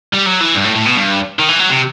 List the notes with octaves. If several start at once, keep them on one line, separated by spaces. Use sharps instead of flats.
G3
F#3
E3
G2
A2
A2
B2
G2
D#3
E3
F#3
C3